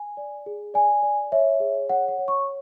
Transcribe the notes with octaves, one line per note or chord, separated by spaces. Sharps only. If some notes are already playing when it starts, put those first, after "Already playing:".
Already playing: G#5
D5
G#4
D5 G#5
D5
C#5 E5
G#4
C#5 F#5
F#5
C#5
C#6